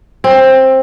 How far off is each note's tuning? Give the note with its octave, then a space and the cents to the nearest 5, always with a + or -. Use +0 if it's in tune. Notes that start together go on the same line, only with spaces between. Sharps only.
C4 +15